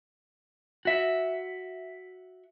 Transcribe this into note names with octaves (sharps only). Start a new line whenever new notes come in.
F#4 E5